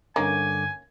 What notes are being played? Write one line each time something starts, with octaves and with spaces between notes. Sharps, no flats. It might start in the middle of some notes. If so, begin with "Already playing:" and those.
G2 D3 A#3 C#4 D#4 G#5 D6